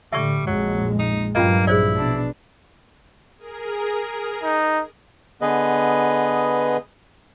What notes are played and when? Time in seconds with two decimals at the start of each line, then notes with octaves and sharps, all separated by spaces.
0.13 A2 D3 G3 E5 C#6
0.47 A#1 F2 F#3 G#3
0.99 D#4
1.35 G2 F#3 A#3 C#4 F4 D#5
1.67 A#1 E4 G#4 C5 D5
1.98 B2 D4
3.38 G#4 A#4
4.43 D#4
5.41 D3 B3 G#4 B4 D#5